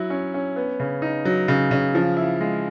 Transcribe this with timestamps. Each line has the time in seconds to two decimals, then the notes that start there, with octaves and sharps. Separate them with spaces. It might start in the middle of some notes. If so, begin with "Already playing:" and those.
Already playing: F#3 E4
0.10 C#4
0.34 C#4
0.56 B3
0.80 C#3
1.02 D#4
1.25 F#3
1.48 C#3
1.71 C#3
1.95 F3
2.17 E4
2.41 G#3